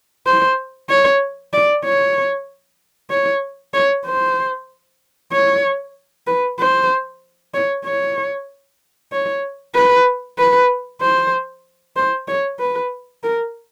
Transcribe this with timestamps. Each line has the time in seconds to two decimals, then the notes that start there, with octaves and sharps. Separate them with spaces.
0.26 C5
0.90 C#5
1.53 D5
1.85 C#5
3.10 C#5
3.74 C#5
4.06 C5
5.32 C#5
6.27 B4
6.59 C5
7.54 C#5
7.85 C#5
9.12 C#5
9.75 B4
10.38 B4
11.02 C5
11.96 C5
12.28 C#5
12.59 B4
13.23 A#4